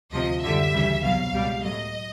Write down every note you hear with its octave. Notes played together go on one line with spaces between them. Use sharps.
D2 C3 F3 D#5
F#2 D3 G3 E5
D2 C#3 E3 G3
C2 B2 F#3 F5
C#2 B2 G3
A2 F#3 D#5